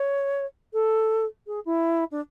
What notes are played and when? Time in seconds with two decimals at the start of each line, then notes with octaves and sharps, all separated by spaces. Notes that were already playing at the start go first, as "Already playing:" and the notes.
Already playing: C#5
0.73 A4
1.46 G#4
1.65 E4
2.11 D4